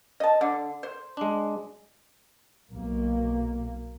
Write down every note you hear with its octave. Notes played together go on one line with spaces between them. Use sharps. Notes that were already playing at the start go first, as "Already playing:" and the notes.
D#5 A5
D3
C5
G#3 D4
B1 A#3